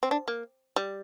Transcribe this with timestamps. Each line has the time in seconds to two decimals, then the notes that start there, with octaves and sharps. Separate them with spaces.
0.03 C4
0.11 D4
0.28 A#3
0.76 G3